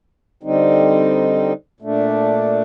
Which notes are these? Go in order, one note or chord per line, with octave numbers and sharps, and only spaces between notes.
D3 G3 C4 D#4
A#2 A3 D4